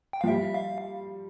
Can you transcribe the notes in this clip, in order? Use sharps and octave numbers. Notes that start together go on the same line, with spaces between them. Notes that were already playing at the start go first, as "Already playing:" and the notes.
G5
F5
F3
G3 E5
F5